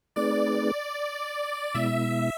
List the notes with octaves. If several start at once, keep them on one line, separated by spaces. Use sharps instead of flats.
A3 C4 D#4 G#4 B4 D5
B2 G#3 B3 E4 E5